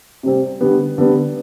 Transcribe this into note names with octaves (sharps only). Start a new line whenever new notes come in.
C3 G3 C4
D3 G3 B3
D3 G3 B3